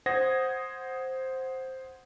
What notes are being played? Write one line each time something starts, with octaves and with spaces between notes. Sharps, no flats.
C5 F#5 D#6 G#6 A#6